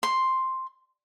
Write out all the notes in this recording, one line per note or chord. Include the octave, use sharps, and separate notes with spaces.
C6